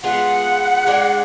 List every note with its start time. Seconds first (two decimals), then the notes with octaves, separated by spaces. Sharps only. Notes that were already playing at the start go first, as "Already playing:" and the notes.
0.03 G#3 B3 F4 G#4 F#5
0.87 G#3 D4 G#4 D5